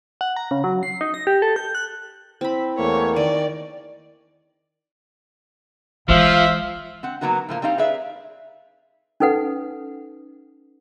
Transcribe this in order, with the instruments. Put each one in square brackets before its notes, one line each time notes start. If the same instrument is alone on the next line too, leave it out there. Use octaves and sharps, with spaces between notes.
[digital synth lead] F#5
A#5
C#3
F#3
C7
D#4
A#6
G4
A4
G6
F#6
[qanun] C4 B5 [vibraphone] E4
[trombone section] E2 A3 A#3 [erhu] C#5
[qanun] D#3 [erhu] D5
[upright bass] E3 G#3 [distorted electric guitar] F3 [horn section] C5 E5 F5
[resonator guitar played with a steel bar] C4 F#5
F#3 G#3 A#3 B3 D#4 F#4
A2 F3 A#3
G3 C4 D#4 F5
G#4 B4 D5 E5 F5
[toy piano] C#4 D#4 A4 B4 F#5